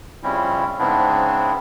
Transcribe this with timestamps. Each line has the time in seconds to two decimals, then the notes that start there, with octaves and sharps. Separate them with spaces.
0.23 F2 C#3 G3 C4 C#4 E4
0.79 G#2 C#3 B3 C4 D4 E4